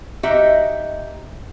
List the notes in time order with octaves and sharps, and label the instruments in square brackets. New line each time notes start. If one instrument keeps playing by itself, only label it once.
[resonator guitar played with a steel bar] D#4 F#4 G4 D#5 E5